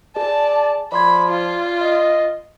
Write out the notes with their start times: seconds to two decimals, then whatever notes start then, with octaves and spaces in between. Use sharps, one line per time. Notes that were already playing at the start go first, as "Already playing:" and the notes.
0.16 G#4 D5 A5
0.92 F3 D5 B5 C6 G#6
1.29 F4
1.81 D#5